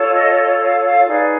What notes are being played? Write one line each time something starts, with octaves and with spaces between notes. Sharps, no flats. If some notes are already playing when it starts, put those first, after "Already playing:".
Already playing: F4 A4 C#5
D#5
F5
F5
D#4 G#4 B4 D5